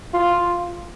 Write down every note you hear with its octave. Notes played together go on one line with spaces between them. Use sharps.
F4